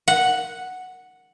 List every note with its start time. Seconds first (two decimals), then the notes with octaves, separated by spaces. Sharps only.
0.08 F#5